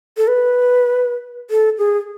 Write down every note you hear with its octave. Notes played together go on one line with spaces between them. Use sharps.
A4
B4
A4
G#4